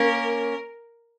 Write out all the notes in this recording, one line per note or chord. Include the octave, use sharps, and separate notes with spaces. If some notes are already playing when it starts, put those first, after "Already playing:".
Already playing: A#3 C#4 A#4